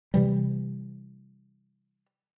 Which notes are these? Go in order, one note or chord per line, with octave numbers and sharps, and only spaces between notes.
C3 E3 G3